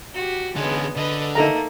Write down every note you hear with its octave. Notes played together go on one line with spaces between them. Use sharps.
F#4 G4
D3 G#3 B3 C#4
D3 B4 D#5
A3 A#3 D#4 A4 A#5